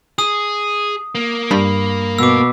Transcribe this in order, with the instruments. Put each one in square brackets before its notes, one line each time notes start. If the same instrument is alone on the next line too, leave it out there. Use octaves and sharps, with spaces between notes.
[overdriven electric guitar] G#4 [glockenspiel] D#6
[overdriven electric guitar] A#3
[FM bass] G2 [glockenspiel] B5
[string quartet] B2 [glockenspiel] D6 E6